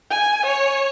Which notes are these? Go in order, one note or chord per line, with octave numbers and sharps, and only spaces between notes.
G#5
C#5